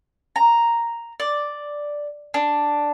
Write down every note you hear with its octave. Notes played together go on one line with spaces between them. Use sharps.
A#5
D5
D4